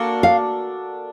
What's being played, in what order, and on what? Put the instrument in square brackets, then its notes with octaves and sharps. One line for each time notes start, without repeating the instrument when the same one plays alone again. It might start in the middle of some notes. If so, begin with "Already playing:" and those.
Already playing: [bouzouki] A#3 D4 F#4 A4
[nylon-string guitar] F5